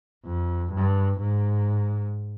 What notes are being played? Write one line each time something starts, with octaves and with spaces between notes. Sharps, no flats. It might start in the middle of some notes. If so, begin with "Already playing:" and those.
F2
G2
G#2